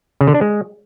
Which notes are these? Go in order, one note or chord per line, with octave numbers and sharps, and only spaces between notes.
C#3
D3
D4
G#3